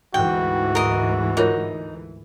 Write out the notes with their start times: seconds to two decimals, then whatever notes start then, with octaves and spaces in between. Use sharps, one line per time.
0.14 D2 G#2 E3 F#4 G5
0.75 A#4 D#5
1.37 D#4 F4 A#4 C#5